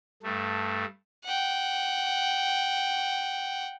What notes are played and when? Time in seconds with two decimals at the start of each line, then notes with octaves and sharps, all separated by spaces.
0.23 G2 A3
1.25 F#5 G5